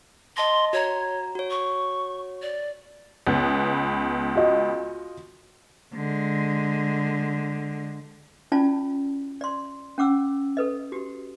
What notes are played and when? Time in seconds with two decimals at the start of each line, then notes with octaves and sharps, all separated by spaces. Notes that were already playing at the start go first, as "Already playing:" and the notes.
0.37 D#5 A5 C6 A#6
0.73 F#4 C#5 A#5
1.35 F#4 C#5
1.50 C#6
2.42 D5
3.27 C#2 B3
4.35 F4 F#4 D#5
5.94 D3 G#3
8.52 C#4 E4 F4 D5 A5
9.41 D5 C6
9.98 C#4 F#5 D6 E6
10.57 A4 B4 D#5
10.92 F#4 G4